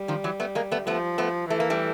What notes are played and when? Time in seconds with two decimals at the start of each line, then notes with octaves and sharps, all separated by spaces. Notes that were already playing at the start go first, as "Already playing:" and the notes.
Already playing: G3
0.08 D#3 F3
0.24 E3 F#3
0.40 A3 B3
0.55 G#3 A#3
0.72 A3 B3
0.87 F3 A3 B3
1.18 A3 B3
1.49 E3 A3
1.60 A#3
1.70 G3 A3